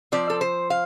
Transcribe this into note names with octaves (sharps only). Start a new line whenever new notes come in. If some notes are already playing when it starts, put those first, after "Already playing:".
F3 C4 D5
A4
C5
F5